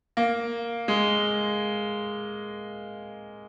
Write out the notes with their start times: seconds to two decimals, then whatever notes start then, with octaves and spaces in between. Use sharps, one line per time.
0.17 A#3
0.88 G#3